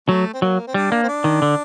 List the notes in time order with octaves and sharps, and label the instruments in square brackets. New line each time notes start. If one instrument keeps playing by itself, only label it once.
[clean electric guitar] F#3 [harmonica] A3
[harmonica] C4
[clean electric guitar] F#3 [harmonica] A#3
[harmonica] C4
[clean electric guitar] G3 [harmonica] D4
[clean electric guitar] A#3
[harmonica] C4
D4
[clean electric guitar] D#3
D3